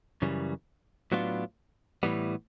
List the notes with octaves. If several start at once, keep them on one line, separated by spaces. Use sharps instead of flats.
F#2 C#3 E3 G3
A2 F#3 B3 D4 F4
A2 E3 G3 B3